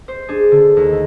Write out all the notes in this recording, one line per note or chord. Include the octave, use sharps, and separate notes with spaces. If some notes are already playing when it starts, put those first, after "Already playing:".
C5
D4 G#4
D3
D#2
A3